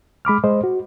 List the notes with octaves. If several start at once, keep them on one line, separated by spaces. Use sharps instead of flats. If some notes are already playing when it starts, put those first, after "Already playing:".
G#3 B5 D6 F6
G#3 C5 D#5
F#4